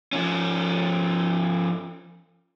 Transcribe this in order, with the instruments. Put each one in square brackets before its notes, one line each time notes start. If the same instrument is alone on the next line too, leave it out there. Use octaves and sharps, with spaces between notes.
[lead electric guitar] F3 C#4